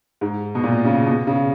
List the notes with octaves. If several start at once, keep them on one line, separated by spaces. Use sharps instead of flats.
G#2
B2
A#2
C#3
B2
C#3